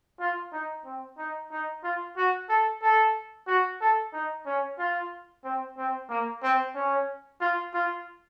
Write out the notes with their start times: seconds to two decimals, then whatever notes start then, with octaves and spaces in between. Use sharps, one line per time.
0.20 F4
0.53 D#4
0.85 C4
1.18 D#4
1.51 D#4
1.84 F4
2.17 F#4
2.49 A4
2.82 A4
3.47 F#4
3.81 A4
4.13 D#4
4.46 C#4
4.79 F4
5.44 C4
5.77 C4
6.10 A#3
6.43 C4
6.75 C#4
7.41 F4
7.74 F4